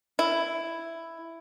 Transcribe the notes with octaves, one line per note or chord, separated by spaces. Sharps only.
E4